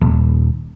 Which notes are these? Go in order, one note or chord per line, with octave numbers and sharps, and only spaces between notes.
D#1